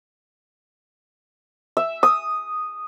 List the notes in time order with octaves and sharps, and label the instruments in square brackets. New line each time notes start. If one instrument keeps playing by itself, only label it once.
[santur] E5
D#6